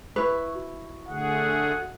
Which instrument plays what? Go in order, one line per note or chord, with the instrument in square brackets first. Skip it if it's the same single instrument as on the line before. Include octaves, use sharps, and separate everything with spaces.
[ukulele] E4 B4 [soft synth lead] C#6
[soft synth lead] F#4
[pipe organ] D3 A3 G#4 [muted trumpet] F#5